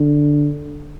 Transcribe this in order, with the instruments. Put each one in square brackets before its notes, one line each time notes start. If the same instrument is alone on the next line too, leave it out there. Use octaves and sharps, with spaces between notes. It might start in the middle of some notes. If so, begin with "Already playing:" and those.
Already playing: [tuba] D3